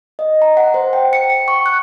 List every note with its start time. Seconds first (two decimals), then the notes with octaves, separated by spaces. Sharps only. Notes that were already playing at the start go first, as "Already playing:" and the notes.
0.19 D#5
0.42 A#5
0.57 F#5
0.74 C5
0.93 G5
1.13 C#7
1.30 C#7
1.48 C#6
1.66 F#6